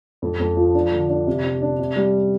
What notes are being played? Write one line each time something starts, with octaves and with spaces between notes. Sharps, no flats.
F2
F2
F3
D4
D3
D4
C3
C3
D4
C3
G3